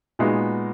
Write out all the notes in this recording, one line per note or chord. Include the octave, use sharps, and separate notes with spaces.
A#2 G#3 B3 D#4 F#4